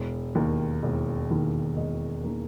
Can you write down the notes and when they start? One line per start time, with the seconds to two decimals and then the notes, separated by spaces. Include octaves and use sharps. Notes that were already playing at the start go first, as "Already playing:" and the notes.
Already playing: E1
0.35 D#2 D#3 A#3
0.83 E1
1.30 D#2 D#3 A#3
1.77 E1 D#5
2.24 D#3 A#3